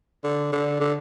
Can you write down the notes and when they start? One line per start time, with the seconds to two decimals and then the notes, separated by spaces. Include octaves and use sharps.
0.24 D3
0.52 D3
0.80 D3